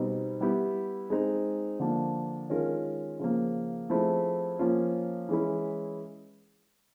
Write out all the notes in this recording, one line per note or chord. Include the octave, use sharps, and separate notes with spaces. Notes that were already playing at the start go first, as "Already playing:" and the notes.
Already playing: B2 G3 C4 D#4
G3 B3 E4 G4
G#3 C4 D#4
D3 F3 A#3 D4
D#3 G#3 C#4 F4 A#4
C#3 F3 A#3
F3 A3 C4 E4 G#4
F3 A#3 C#4 F4
E3 G#3 C#4 E4